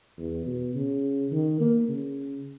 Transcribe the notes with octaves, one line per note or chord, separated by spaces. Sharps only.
E2
B2
C#3
D#3
A#3
C#3